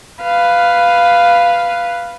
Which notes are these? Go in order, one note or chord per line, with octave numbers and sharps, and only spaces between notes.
B4 F5